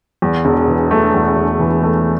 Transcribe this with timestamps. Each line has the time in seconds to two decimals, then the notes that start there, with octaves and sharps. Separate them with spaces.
0.22 E2
0.45 E1
0.68 E3
0.91 A3
1.14 E2
1.36 E1
1.60 E3
1.83 A3